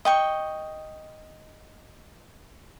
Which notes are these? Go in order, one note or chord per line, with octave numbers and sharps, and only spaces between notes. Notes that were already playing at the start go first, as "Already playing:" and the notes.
D#5 G5 C#6